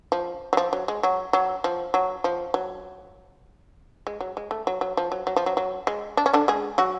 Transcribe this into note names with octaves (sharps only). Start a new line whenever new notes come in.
F3
F#3
F3
F#3
G#3
F#3
F#3
F3
F#3
F3
F#3
G#3
F#3
G#3
A3
F#3
F#3
F3
F#3
F#3
F3
F#3
F#3
G#3
D4
C#4
D3 D4
G#3 G#4
F#3 F#4